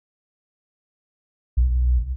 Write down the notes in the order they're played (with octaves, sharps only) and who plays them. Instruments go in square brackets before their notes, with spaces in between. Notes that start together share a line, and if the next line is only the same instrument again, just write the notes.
[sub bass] B1